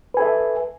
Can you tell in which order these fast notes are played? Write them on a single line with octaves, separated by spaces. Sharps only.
B4 G#5 A4 E5